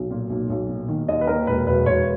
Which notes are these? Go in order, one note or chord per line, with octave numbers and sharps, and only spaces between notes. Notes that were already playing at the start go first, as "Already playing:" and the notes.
Already playing: B1
A#2
B1
B1
A#2
D#3
D#2 D#5
B4
D#2 A#4
E1 B4
E1 B4
E1 C#5